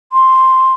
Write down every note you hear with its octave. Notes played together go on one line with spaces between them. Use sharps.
C6